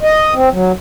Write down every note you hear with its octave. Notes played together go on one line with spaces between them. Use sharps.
D#5
C4
F#3